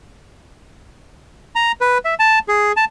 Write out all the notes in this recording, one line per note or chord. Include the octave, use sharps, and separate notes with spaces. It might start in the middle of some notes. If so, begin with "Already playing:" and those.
A#5
B4
E5
A5
G#4
A5